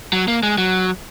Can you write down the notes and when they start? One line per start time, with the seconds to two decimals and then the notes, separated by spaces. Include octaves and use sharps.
0.13 F#3
0.28 A#3
0.43 G#3
0.58 F#3